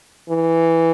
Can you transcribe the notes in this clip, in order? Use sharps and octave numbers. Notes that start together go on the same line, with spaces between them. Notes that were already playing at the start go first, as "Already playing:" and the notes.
E3